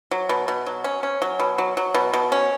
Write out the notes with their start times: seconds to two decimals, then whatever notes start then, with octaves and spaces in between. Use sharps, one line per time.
0.11 F#3
0.29 B2
0.48 B2
0.66 F#3
0.84 C#4
1.03 C#4
1.22 F#3
1.39 B2
1.58 F#3
1.77 F#3
1.94 B2
2.13 B2
2.32 C#4